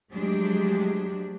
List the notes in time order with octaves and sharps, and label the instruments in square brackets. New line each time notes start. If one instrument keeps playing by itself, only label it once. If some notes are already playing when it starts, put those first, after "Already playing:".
[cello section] F3 F#3 G#3 A3 D4 G4